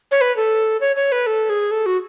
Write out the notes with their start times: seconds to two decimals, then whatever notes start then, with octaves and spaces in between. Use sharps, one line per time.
0.11 C#5
0.21 B4
0.36 A4
0.81 C#5
0.96 C#5
1.12 B4
1.27 A4
1.50 G#4
1.71 A4
1.86 F#4